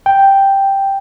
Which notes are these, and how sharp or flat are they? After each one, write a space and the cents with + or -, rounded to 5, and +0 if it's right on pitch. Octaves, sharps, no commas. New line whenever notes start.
G5 +0